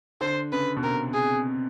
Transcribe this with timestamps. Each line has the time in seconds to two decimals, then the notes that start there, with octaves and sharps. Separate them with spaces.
0.21 D3 C5
0.52 C#3 B4
0.76 B2
0.83 C3 A#4
1.13 G#4